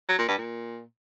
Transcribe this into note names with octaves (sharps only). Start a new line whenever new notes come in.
F#3
A#2
G2
A#2